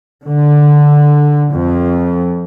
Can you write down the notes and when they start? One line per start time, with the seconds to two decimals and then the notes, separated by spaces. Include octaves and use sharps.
0.24 D3
1.51 F2